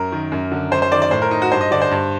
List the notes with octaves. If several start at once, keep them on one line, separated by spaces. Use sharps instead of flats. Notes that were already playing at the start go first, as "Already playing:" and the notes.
Already playing: F#2 A#4
D#3
F#2
D3
F#2 C5
C5
D#3 D5
D5
A2 C5
A#4
D#4
F#4
G2 C5
D#5
D3 D5
C5
G2